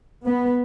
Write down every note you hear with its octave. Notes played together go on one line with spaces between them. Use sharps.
B3